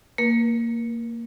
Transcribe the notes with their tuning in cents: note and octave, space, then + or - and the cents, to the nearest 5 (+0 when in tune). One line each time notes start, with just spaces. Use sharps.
A#3 -10 A#4 +45